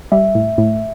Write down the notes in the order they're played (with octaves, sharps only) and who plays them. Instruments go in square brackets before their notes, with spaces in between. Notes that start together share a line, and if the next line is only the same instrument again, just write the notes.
[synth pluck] G3 [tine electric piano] E5
[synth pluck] A2
A2